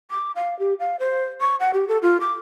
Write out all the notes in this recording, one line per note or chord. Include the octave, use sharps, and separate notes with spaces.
D6
F5
G4
F5
C5
C#6
F#5
G4
A4
F4
D6